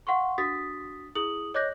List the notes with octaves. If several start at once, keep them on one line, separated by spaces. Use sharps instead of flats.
F5 F#5 C6 C#6
D4 F#4 D#6 A6 B6
E4 G#4 D#6 F#7
C#5 D#5 D6 F#6 G6 A#6